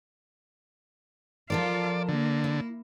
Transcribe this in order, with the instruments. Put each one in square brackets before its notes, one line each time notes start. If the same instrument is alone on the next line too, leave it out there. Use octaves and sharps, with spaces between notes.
[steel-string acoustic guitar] F3 A4 A#4 [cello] F4 [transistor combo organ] D5
[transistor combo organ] D3 [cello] A#3
[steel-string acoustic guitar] E4